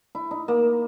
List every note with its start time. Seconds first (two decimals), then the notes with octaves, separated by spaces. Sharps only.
0.15 E4
0.31 D#4
0.48 A#3